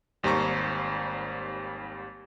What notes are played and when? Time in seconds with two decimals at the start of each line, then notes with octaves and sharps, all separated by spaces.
0.23 G#1 D#2 G3 C5 A#5 C#6